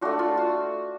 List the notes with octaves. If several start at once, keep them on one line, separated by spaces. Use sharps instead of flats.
A3 D4 F4 F#4
F4
F#4